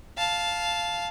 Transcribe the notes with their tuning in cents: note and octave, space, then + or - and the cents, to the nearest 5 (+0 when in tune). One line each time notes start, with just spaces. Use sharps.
F5 +0 A5 -10